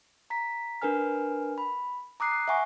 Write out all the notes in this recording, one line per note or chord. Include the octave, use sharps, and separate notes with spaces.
A#5 B6
D4 A#4 B4 G#5 F6
B5
A#5 D6 D#6 F#6 C7
E5 F#5 G#5 C#6